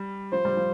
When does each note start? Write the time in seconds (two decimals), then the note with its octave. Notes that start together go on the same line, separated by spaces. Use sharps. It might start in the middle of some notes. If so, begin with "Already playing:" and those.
Already playing: G3
0.32 F3 C5
0.45 G3
0.57 F3